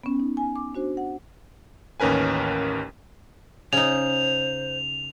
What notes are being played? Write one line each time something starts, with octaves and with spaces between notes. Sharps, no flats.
B3 C#4
D#4
G#5
D6
D4 F#4 C5
F#5
A1 D#2 C#4 A#4 B4 G#5
C#3 D#4 C5 F7